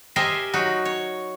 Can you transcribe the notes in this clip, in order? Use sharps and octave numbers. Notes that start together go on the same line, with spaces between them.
G4 A#4 C5 D#5 E5 G#5
F#3 D#4 F#4
C#5